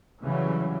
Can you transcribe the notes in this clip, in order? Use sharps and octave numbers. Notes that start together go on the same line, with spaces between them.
C#3 E3 F#3 G3